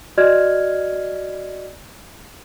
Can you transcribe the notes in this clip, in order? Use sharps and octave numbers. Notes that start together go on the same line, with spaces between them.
F#4 D5 D#5 F6 G#6